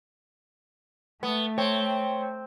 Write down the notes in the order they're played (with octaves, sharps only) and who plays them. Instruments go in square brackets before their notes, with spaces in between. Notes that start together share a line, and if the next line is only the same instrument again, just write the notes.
[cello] A3 [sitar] B3
[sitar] C4 [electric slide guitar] C#5